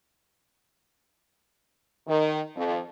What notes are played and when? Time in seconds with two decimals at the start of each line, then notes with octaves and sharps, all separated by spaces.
2.08 D#3
2.56 F2